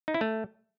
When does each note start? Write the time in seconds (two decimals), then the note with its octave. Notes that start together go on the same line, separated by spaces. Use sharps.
0.08 D#4
0.14 E4
0.21 A3